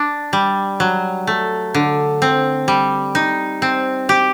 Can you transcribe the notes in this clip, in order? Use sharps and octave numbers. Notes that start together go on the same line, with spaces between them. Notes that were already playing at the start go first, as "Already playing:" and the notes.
Already playing: D4
G3
F#3
A3
D3
C4
G3
D#4
C4
G4